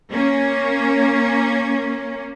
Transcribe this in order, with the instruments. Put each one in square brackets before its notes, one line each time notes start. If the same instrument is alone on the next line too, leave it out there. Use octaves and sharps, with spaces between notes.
[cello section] A#3 C#4